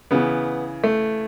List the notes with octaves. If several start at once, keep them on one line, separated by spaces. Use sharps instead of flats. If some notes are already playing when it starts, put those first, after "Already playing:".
C#3 E3 B3
A3